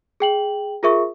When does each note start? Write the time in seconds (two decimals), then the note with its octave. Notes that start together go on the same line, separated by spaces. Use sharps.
0.20 G#4 G5 F#7
0.83 F4 G#4 A#4 E5 C#6